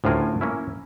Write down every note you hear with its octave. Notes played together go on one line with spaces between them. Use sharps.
D2 A2 C#3 F4 A#4 G#5
A#3 C#4 E4